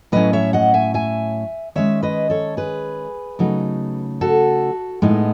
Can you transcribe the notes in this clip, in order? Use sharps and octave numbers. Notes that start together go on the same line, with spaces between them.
A2 F#3 C#4 B4 D#5
C#5 E5
D#5 F#5
E5 G#5
E5 G#5
D#3 G#3 C#4 C#5 E5
B4 D#5
A4 C#5
G#4 B4
C#3 F#3 A3 D#4
F#4 A4
A2 G#3 B3 D#4